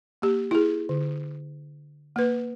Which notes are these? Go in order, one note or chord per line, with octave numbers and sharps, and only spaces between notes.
A#3 G4
E4 G#4
D3
A#3 B4